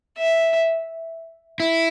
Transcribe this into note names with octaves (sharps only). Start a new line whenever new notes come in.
E5
E4